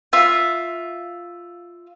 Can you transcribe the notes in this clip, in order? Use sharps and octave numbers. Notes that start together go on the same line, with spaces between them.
F4 E5